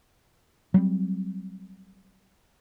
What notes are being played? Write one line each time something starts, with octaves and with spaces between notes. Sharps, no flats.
F#3 G3 C4